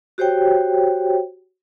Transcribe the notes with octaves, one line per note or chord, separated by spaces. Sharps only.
F#4 G4 C5 C#5 G5